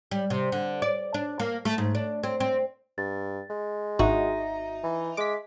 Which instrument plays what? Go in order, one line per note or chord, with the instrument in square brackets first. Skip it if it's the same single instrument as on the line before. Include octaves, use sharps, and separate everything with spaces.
[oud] G3
C3
D3
D5
D4
A#3
A3
G#2
D4
C4
C4
[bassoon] G2 [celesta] A6
[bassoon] G#3
[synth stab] G#1 F#4 [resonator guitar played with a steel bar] D#4 [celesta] E5
[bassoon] E3
[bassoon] G#3 [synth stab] D6 B6